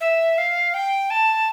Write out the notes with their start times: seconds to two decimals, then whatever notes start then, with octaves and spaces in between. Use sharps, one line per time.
0.01 E5
0.38 F5
0.74 G5
1.10 A5